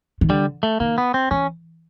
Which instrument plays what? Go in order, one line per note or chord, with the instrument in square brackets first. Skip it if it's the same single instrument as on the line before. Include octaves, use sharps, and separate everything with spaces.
[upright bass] D#3
[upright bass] D3 [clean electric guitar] G3
[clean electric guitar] A3
[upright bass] D#3 [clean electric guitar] A#3
[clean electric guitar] B3
C4
[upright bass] E3 [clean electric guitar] C#4